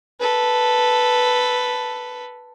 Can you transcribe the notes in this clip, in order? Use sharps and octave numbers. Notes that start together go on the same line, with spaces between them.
A4 B4